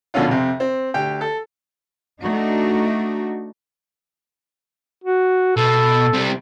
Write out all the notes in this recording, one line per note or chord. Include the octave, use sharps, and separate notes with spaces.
A#1 B2 D3 C#4 F4
F2 C3
C4
D2 G4 G5
A4
A3 D4 D#4 F#4
F#4
B2 A4
C3 G3